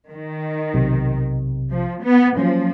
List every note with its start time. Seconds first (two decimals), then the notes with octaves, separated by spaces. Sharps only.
0.11 D#3
0.74 B1 C3
1.71 F3
2.03 B3
2.37 F3 F#3 A#3 C#4